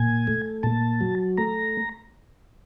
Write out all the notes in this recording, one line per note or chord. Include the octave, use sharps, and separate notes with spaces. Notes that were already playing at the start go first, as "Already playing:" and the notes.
Already playing: A#2 G#5
A3
A#2 A5
F#3
A3 A#5